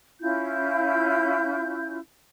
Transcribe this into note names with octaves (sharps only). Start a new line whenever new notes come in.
C#4 E4 F4 G6